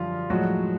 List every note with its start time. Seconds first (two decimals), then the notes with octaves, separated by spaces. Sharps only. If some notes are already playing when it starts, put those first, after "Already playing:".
Already playing: F#2 D3 F3 G3 F4
0.30 A2 F3 F#3 G#3 F#4